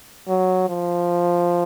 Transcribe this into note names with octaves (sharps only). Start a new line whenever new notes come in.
F#3
F3